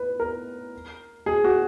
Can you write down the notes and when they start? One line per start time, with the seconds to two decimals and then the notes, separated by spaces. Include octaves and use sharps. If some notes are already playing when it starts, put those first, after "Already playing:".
Already playing: B4
0.20 A#4
1.26 G#4
1.44 F#4